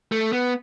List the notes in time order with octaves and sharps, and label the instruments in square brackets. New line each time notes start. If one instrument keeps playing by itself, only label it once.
[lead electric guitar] A3
B3